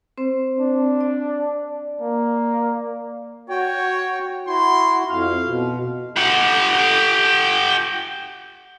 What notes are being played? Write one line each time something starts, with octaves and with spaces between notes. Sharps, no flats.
C4 C5
D4
D5
A#3
F#4 C#5 G5
E4 F#4 C6
F2 F5
B2
G4 F#5